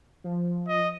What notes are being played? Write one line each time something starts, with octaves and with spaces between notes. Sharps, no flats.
F3
D#5